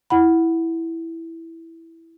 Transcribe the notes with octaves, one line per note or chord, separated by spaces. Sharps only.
E4 F#5 B5